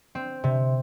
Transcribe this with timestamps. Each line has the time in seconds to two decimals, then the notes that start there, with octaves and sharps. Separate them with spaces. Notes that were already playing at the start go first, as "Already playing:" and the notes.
0.15 C4
0.44 C3